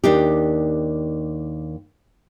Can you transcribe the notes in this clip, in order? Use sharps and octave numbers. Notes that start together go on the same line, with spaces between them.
D#2 D4 D#4 G4